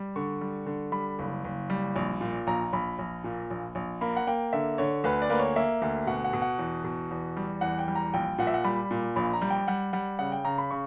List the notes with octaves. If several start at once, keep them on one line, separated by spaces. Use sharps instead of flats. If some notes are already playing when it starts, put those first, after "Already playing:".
Already playing: G3
D3 C#6
G3
D3
G3 B5
F#1
F#1
G3
A#1
A#2
A#1 A#5
A#1 B5
A#1
A#2
A#1
A#1
A#3 B5
F#5
A#3 G5
D3 E5
D3 C#5
D2 B4
D5
A#3 B4
C#5
A#3 E5
D2
B2 F#5
F#5
B2
F#5
E2
B2
E2
G3
E2 F#5
G5
G3
A#5
A#1 G5
A#2 F#5
E5
F#5
G3 B5
A#2
A#1 B5
A#5
G3
G5
G3 F#5
G3 F#5
C#3 F#5
G5
C#3 A#5
B5
C#3 C#6